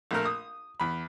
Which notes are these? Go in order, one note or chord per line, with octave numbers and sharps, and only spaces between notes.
A#1 A3 A#4
D#6
E2 B5